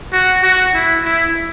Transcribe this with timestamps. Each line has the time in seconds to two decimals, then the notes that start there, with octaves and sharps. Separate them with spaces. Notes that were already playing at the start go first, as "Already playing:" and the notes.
0.12 F#4
0.43 F#4
0.74 E4
1.04 E4